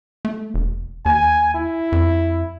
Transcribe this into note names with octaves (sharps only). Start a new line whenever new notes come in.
A3
E1
D#2 G#5
E4
F2